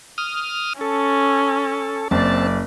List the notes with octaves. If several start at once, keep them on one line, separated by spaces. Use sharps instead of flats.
D#6 F6
C#4 A4
F#1 C4 D5 A5